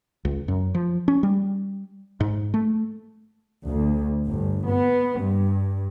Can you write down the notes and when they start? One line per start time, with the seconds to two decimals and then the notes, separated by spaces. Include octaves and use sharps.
0.25 C#2
0.48 F#2
0.75 F3
1.08 C#4
1.23 G3
2.20 G#2
2.54 A3
3.66 D2
4.28 G1
4.68 B3
5.19 G2